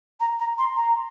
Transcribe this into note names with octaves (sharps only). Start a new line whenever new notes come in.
A#5
A#5
C6
A#5